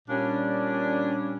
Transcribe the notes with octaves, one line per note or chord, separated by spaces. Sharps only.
A#2 G3 C#4 D4